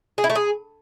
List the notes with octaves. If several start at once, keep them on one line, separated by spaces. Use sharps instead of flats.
G#4
E4
A3
G#4